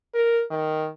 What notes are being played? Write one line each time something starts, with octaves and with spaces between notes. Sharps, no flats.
A#4
D#3